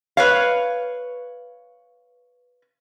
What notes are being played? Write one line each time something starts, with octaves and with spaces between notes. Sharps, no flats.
B4 C#5 F5